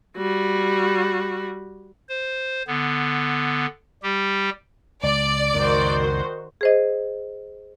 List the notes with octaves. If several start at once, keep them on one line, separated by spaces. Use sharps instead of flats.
G3 F#4
C5
D3 B3
G3 G4
C#2 D5
C#2 F#2 D#3 F#4 C5
G#4 C5 D#5